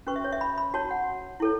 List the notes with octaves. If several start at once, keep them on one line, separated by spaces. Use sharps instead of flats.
C#4 F#4 B4 C#6
E5
C#5
E5
B5
B5
F#4 C#5 A5
F#5
E4 A4 C#5